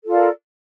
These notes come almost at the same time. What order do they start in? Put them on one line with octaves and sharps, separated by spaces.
A4 F4 D5 A#4